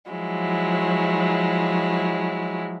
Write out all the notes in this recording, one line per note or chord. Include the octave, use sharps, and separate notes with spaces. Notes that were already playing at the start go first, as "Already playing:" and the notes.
F3 F#3 G#3 E4